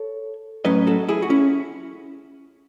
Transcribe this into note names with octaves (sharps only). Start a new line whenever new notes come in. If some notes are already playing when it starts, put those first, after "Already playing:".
Already playing: A4 C#5
A2 F#3 C#4 B4 D#5
F#4 A4
E4 G#4
F#4
C#4 E4